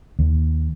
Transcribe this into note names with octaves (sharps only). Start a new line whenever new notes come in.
D#2